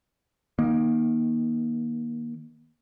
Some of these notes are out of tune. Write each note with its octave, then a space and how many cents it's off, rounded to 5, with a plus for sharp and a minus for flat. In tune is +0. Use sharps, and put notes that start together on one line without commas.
D#3 +0 A#3 +25